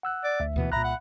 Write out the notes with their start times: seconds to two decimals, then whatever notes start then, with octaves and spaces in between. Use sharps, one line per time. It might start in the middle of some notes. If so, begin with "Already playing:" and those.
0.03 F#5 E6 F#6
0.24 D5
0.40 D2 E5
0.56 D#2 B2 E3 B3
0.72 C2 A#2 E5 A#5 B5 F#6
0.84 F#5